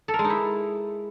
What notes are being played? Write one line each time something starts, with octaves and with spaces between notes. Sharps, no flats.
A4
A#4
G#3
D#4
E4